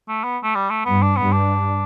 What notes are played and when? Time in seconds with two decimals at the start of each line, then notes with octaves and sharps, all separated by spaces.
0.08 A3
0.24 B3
0.43 A3
0.55 G3
0.70 A3
0.85 G2 B3
1.02 D4
1.16 G2 B3
1.32 D4